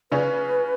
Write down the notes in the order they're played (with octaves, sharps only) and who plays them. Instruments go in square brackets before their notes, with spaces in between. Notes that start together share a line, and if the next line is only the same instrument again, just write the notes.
[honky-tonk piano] C#3 C#4 [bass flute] B4